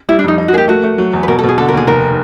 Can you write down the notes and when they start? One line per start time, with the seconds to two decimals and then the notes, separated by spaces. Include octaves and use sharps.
0.09 G3 E4
0.19 D4
0.24 F2 D#4
0.38 D#4
0.48 F#4
0.53 A#3 G#4
0.58 G4
0.68 A3 F#4
0.84 A3
0.98 F#3
1.13 E2
1.23 B4
1.28 B2 A#4
1.39 A4
1.43 B2
1.49 G#4
1.58 D3 A4
1.69 A#4
1.73 D#2 G#4
1.87 F1 A#4